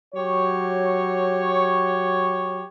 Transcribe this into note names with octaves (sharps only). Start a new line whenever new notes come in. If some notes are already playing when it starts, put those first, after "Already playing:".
F#3 G4 C#5